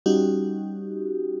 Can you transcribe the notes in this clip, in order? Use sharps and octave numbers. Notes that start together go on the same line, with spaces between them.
G3 C#4 D#4 F#4 G4